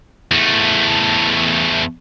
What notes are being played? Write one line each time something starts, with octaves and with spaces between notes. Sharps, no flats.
E2 A3